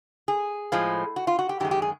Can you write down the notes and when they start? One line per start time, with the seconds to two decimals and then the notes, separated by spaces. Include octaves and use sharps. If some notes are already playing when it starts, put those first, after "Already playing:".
0.28 G#4
0.72 A2 F3 G#3
1.16 F#4
1.27 F4
1.39 F#4
1.49 G4
1.60 F#2 D#3 G#3 G4
1.71 G4
1.82 G#4